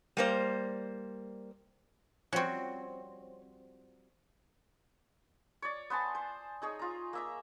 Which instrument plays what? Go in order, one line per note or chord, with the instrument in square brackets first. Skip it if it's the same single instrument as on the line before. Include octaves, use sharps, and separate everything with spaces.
[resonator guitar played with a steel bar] G3 A#3 C5
[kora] F3 G3 [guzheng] C4 F#4 [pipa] C#4 C#6
[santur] C#5 D5
B3 C5 G#5 A5
C5
D#4 G#4 C#5
F4 A#5
A#3 E5 A#5